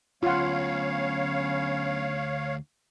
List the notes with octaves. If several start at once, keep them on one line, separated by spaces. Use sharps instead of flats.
D2 F#3 B3 C#4 F4 C#5 F5 F#5